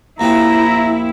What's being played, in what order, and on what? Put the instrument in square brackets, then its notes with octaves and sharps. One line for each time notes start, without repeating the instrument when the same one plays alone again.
[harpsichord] D#2 F3 C4 [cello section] E4 [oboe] A#5